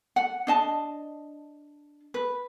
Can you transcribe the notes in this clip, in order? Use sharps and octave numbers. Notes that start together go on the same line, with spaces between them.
F#5
D4 D#5 A5
B4